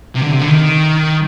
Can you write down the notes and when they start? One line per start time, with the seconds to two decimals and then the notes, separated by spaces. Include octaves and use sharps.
0.15 C3
0.22 D3
0.31 C3
0.40 D3
0.48 D#3